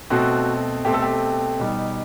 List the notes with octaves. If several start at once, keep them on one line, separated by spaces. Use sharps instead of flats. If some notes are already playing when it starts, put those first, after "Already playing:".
B2 A3 C4 F#4
B2 A3 C4 G4
A4
G4
B2 G3 D#4